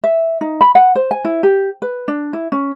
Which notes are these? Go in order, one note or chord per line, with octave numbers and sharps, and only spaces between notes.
E5
D#4
B5
F#5
C5
G#5
E4
G4
B4
D4
E4
C#4